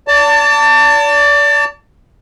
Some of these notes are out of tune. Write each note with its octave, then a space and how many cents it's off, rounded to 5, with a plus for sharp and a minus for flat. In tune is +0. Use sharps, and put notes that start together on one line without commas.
D5 -35 A5 +25